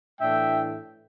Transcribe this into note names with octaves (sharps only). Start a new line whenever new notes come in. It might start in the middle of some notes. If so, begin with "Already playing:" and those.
A2 E3 A3 D4 E5 G5